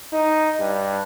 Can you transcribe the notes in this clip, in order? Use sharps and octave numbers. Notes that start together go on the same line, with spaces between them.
D#4
G2